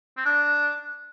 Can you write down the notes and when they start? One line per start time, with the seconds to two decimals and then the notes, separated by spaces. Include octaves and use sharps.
0.17 C4
0.25 D4